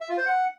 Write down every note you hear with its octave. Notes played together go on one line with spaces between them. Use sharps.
E5
F4
C5
F#5